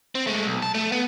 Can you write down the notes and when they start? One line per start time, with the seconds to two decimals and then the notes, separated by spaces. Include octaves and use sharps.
0.15 C4
0.27 G#3 A3
0.46 B1
0.63 A5
0.75 A3
0.92 B3